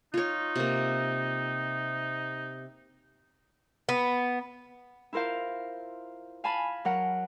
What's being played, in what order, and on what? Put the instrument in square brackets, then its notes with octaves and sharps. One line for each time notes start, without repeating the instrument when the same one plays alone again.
[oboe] D#4 [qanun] F4 C#5
[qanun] C3 A#3
[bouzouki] B3
[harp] E4 F4 A#4 C5 F5
F5 G#5 A5 B5
F#3 A#4 F#5